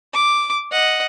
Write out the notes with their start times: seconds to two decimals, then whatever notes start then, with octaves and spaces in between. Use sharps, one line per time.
0.14 D6
0.72 D#5 F#5